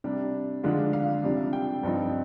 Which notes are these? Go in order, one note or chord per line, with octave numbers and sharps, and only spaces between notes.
C3 G3 D4
F2 D3 G#3 D4 F4
F5
F2 C3 G3 D4
G5
G2 F3 C4 D#4